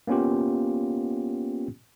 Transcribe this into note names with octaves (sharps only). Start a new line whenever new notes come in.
A#3 B3 C#4 F4 G4